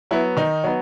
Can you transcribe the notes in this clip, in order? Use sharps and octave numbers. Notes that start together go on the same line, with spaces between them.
F#3 B3 E4
D#3 D#4
F#3 B3